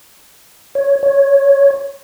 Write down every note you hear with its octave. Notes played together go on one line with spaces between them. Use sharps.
C#5
C#5